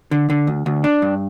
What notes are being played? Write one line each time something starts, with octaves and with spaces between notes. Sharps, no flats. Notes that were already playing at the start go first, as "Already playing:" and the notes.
D3
D3
D2
D2
D4
G2